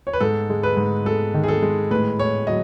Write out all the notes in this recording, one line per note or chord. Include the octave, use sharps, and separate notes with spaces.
C#5
B4
G#2 A4
G#3
B4
G#2
G#3 A4
D#3
G#4
A4
G#3
A2 B4
A2 C#5
F#3 D#5